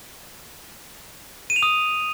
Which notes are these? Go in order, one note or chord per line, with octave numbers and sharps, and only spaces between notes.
D#7
F7
D#6